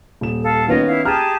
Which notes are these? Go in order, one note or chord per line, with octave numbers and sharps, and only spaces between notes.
D#1 E7
A4 F5 A5
D#3 B3 C#4 F4 D#5
E4 F5
G4 G#4 A5 A#5 F6